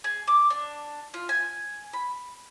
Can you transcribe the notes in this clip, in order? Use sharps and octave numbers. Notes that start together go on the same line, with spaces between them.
G#4
D6
D4
F4
G#5
B5